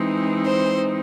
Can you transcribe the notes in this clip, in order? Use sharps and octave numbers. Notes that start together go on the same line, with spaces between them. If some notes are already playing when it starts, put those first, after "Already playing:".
Already playing: E3 G#3 C4 D#4
C5